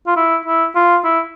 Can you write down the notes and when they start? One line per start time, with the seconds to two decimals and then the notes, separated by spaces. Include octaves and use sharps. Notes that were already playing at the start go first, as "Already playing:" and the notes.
0.07 F4
0.16 E4
0.45 E4
0.75 F4
1.05 E4